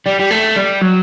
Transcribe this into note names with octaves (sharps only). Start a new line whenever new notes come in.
G3
G3
A3
G3
F#3